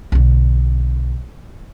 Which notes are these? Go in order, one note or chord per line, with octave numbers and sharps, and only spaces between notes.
B1 D3